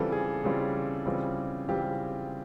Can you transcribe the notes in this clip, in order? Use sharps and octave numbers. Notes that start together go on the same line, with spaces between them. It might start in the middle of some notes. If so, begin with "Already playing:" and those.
Already playing: C#3 E3 G3 C4 F4 A4
G#4
C#3 E3 G3 C4 F4
C#3 E3 G3 C4 F4
C#3 E3 G3 C4 F4 G4